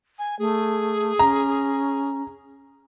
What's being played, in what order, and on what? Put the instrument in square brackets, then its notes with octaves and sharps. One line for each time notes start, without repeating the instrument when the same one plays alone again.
[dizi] G#5
[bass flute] A3 [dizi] G#4
[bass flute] C#4 [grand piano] A#5